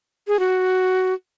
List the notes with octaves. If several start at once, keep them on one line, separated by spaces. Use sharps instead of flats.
G#4
F#4